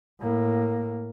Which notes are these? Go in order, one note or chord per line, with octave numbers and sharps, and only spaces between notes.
A2 A#3